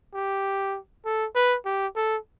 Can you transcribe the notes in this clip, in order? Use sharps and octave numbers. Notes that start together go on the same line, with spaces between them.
G4
A4
B4
G4
A4